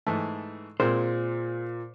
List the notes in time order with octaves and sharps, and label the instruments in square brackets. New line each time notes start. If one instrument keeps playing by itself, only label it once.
[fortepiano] G#2 E3 A3
[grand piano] A#2 [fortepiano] G#3 C4 A#4 [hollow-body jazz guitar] C5